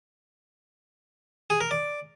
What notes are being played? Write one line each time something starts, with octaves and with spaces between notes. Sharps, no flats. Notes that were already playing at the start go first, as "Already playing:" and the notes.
G#4
A#4
D5